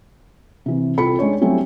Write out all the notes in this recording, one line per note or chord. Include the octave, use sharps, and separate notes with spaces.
C3 E3
C2 C4 F4 A4 B5 C#7
G#3 C#4 D4 C#5
F#3 G3 A3 C4 C#4 E4